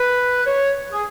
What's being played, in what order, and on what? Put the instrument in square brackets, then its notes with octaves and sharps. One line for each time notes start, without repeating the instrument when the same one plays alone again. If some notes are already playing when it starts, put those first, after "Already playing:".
Already playing: [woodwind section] B4
C#5
G#4